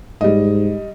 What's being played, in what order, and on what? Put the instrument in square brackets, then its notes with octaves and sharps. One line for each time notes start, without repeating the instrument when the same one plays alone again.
[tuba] G#2 [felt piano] G3 D#5